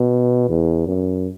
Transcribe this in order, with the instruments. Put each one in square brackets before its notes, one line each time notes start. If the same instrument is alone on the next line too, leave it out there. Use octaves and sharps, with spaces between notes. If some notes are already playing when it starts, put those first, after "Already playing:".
Already playing: [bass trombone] B2
E2
F#2